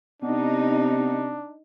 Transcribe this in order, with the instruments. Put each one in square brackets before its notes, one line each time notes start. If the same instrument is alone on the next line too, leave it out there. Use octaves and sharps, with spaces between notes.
[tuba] C3 [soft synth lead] B3 [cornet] D4 [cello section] D#4